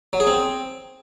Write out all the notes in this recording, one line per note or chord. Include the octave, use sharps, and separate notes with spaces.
F#3
G#4
C4